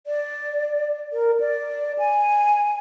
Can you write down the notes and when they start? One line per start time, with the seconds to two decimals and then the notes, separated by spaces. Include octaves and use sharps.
0.07 D5
1.13 A#4
1.40 D5
1.99 G#5